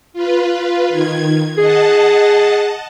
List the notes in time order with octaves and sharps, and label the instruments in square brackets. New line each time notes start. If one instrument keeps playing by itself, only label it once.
[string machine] F4 B4
D#3 G#6
[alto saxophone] G#4 [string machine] D#5 F#5 A5